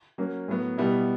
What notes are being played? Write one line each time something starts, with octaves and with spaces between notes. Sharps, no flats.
F#3 A#3 C#4
A2 F#3 B3
B2 G3 B3 E4